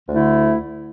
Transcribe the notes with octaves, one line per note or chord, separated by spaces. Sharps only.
D2 D3 A3 E4